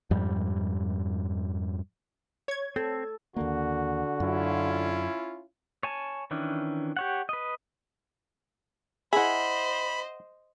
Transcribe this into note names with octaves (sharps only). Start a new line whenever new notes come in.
F2 G#2 G3
C#5 G#6
C4 A4
D#2 D3 A#3 F#4
F#2 C#4 E4 F4
C#5 G#5 A5
D#3 E3 C#4 D4
G4 C#5 F#5
B4 D#5
E4 G#4 C5 D#5 E5 F#5 B5